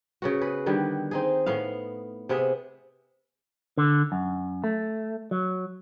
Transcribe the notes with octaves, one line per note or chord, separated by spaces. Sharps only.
C#3 B3 F#4
G#4 B4
D3 D#3 G3 B3
C4 D#4 G#4
A2 B3 F5
C3 B3 G#4 E5
D3
F#2
A3
F#3